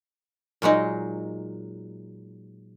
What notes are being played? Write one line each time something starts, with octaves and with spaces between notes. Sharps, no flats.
A#2 F#3 G#3 D#4